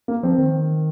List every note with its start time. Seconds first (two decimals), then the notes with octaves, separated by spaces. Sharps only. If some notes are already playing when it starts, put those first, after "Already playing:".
0.08 A#3
0.23 F3 C4
0.38 D#3